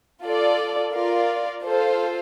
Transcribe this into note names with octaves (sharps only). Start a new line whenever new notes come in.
F4 A4 D5
F4 A#4 D5 F5
F4 A4 C5 F5